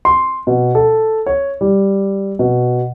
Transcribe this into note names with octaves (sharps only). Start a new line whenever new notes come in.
C6
B2
A4
C#5
G3
B2